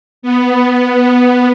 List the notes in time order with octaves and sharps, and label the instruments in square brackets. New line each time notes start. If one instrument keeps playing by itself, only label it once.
[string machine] B3